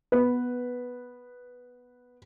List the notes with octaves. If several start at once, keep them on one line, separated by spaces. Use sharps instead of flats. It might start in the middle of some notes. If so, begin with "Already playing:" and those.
B3 B4